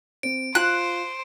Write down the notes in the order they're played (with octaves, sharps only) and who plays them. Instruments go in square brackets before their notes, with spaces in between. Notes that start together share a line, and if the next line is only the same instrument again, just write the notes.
[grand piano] C4 [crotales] D7
[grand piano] F4 [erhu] C5 [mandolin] F#6